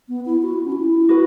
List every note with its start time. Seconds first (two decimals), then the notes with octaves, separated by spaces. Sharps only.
0.09 B3
0.26 E4
0.42 F#4
0.53 E4
0.65 C#4
0.72 F#4
0.76 E4
1.09 F#4 B4